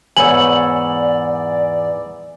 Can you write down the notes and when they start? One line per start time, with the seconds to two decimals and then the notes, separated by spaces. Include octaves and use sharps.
0.17 E2 G#2 C#5 D5 G#5 B5 E6 F#7